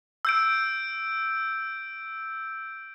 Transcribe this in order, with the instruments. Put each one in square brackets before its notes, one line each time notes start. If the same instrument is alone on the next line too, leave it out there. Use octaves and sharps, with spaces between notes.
[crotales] E6 G6 D7